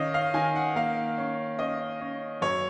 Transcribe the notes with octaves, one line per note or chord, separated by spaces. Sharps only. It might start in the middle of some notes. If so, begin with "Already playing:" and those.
Already playing: D#3 C#4 D#5 F5
F5
D#3 G#5
F#5
A#3 F5
C#4
C#4 D#5
C#4
F#2 C#5